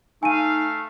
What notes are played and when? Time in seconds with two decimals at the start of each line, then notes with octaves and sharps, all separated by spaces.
0.23 A3 D#4 F5 G#5 D#7